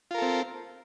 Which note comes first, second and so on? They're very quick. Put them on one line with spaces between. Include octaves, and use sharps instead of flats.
F4 A#4 A4 C4